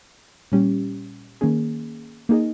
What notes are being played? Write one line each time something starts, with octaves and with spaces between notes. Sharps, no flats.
A#2 G3 C#4 G4
D#3 A#3 C#4 G#4
A#3 D#4 G#4 D#5